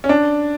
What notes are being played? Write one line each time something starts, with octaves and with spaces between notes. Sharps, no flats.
C#4
D4